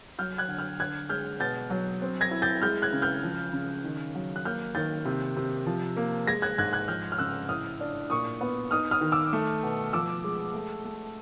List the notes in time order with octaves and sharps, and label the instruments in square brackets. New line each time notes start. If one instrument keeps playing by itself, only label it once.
[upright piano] F#3 F6 G6
F#6 G#6
D3
F6 G6
D3 F#6 G#6
G#3 F6 G6
B2 G6 A6
F#3
C4
G#6 A#6
E4
G6 A6
G#3 F6 G6
F#6 G#6
C#3
F6 G6
F3
C#3
D#3
F#3
F#6
A#3 F6 G6
D#3 G6 A6
C3
C3
F3
A#3
G#3 G#6 A#6
F#6 G#6
G#2 F#6 G#6
F#6 G#6
F3 F6 G6
F6
C#3 E6 F#6
A2 D#6 F6
D4
A#2 C#6 D#6
B3
D#4 D#6 F6
D#6 F6
D#3
D6 E6
A3
B2
F3 D6 E6
G#3
A3
A3